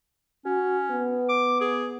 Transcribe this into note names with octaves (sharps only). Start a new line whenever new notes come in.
C#4 F#4
B3
D6
G#4